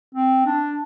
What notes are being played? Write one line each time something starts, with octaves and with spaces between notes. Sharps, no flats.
C4
D4